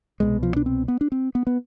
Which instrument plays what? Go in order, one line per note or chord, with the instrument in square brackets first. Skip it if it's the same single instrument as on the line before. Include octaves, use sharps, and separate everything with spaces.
[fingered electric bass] C2 B2 G#3
F3
D4
C4
B3
D4
C4
B3
B3